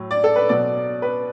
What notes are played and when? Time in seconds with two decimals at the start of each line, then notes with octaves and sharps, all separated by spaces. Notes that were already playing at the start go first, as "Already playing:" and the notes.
Already playing: A2 F#3
0.11 D5
0.24 A4
0.36 B4
0.49 B2 F#3 D5
1.02 B4